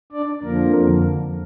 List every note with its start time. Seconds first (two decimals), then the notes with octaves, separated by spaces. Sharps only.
0.12 D4 D5
0.43 F2 D3 F3 A#3 A#4